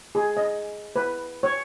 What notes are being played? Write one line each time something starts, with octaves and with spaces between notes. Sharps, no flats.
G#4
D#5
B4
C#5